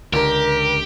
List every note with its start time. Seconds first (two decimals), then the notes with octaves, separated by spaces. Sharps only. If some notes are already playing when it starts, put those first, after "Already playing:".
0.13 C#2 D3 G4 A#4